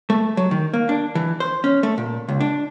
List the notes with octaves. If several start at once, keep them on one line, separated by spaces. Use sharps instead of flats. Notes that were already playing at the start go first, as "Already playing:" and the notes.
A3
F#3
D#3
A#3
D4
E3
C5
C#4
A3
A#2
C#2
D4